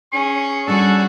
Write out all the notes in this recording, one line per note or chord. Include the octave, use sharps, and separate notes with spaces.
C#4 G#4 C#6
G3 C#4 D4 F#4 G#4 A4